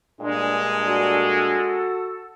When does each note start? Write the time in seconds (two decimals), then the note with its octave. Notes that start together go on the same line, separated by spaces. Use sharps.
0.20 G2 A#2 G#3 D4
0.87 F#4 A4